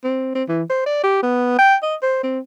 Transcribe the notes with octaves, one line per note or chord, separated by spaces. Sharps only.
C4
C4
E3
C5
D5
G4
B3
G5
D#5
C5
C4